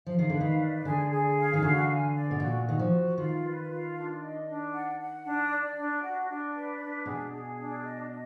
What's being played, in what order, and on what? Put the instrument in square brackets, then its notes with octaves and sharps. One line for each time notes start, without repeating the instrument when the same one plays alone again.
[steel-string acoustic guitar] F3 [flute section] F5
[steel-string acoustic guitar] D#3
[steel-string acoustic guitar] D3 [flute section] B4
[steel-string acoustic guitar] D#3
[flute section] D5
[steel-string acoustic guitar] D3 [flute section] G#4
[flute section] G#4
F5
[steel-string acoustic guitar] D#3
[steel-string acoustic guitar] D3 [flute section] F#4
[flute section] G#5
D5
[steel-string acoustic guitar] B2
[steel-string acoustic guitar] A#2 [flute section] F#4
[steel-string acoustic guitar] D#3 [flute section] F#4
[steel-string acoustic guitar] F3
[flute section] F#4
[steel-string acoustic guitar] D#3 [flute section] F4
[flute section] B4
F4
D4
D#5
D4
F#5
F#5
D4
D5
D4
F#4
D4
B4
D4
[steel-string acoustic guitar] B2 [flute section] G#4
[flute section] G#4
D4
D#5
D#5